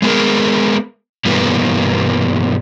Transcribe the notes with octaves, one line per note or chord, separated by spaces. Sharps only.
G#3 B3 F4 G#4 A#4
G2 B2 E3 G3 A#3 B3